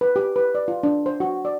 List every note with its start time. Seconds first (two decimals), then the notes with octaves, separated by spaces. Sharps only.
0.01 B4
0.16 G4
0.36 B4
0.55 D5
0.68 F4
0.83 D4
1.06 C5
1.20 F#4
1.45 D5